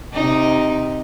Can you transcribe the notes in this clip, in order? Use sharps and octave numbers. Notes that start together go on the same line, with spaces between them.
C3 D#4